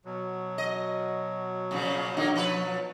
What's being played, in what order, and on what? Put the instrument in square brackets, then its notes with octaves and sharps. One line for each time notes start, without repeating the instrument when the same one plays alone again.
[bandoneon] B2 F#3
[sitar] D#5
A#2 C#3 F3
D3 A#3 D#4
F3 B4 C#5